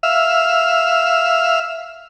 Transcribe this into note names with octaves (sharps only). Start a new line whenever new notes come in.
E5 F5